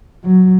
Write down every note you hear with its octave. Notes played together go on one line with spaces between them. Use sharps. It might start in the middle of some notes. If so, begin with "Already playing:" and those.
F#3